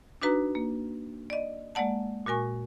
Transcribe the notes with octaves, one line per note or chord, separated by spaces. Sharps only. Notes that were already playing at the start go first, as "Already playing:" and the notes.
D4 D#4 F#4 B4 A#5
A#3
D5 D#5
G#3 A#3 D5 F#5 A5
A#2 F#4 A#4 G#5 C#6